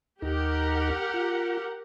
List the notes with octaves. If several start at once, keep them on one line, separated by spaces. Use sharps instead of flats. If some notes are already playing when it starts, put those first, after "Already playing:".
D#2 D#4 G4 A#4 F#5 A#5
F4